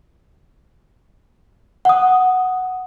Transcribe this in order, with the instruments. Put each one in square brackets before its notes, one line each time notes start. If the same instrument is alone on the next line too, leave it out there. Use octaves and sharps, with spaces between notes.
[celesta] F#5 D#6